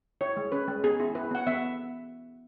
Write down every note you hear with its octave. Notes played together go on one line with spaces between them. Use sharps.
E4 C#5
G#3
C#4 B4
G#3
B3 G#4
E4
E4 B4
B3 F#5
B3 E5